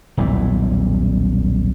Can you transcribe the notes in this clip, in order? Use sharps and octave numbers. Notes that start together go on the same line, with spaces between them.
D#1 B1 E2 E3